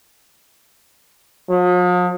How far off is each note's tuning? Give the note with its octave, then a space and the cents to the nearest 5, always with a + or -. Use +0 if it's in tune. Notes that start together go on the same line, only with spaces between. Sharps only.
F3 +45